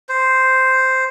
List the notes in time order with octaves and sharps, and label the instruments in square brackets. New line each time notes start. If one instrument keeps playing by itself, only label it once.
[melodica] C5